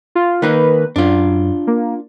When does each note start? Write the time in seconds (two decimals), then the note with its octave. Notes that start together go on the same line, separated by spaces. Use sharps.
0.15 F4
0.42 D#3 A#3 D#4 B4
0.96 F#2 D4 F4
1.67 A#3